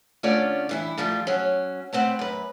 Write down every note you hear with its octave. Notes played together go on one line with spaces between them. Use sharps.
D3 A3 C#4 F4 C#5 D5
G2 E3 E4
A#2 F3 G3 A3 F4
F#3 C#4
A3 B3 C4 F5 F#5
F#2 B4